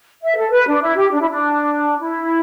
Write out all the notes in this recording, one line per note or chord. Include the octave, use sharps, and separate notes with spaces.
E5
A4
B4
D4
E4
G4
D4
E4
D4
E4